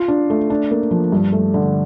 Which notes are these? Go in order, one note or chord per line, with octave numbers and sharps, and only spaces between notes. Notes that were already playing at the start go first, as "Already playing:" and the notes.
Already playing: F4
D4
A3
D4
A#3
F3
G2
A3
D3